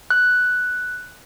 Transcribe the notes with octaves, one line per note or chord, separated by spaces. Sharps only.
F#6